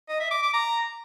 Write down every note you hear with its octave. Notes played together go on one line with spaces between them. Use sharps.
D#5
E5
D6
D6
A#5